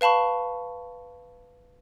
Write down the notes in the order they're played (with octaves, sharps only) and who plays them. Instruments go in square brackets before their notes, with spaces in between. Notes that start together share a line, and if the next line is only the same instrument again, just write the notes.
[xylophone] B4 F5 A5 B5 C#6